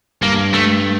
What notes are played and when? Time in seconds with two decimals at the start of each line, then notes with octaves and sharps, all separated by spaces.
0.22 G2 A#3
0.53 A3